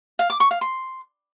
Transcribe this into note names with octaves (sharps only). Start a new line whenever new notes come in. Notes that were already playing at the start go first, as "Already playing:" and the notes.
F5
D6
C#6
F5
C6